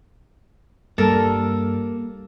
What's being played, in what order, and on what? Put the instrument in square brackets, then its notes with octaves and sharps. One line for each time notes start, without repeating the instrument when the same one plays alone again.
[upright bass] G2 [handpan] G3 [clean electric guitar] A#3 [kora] A4 A#4